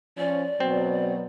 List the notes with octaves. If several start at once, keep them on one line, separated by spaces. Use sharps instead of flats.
F3 C#4 D5
B2 F#3 C4